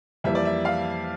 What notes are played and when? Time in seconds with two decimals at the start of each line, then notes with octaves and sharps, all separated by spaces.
0.24 F2 E3 G3 A#3 E5
0.35 D5
0.45 E5
0.65 F5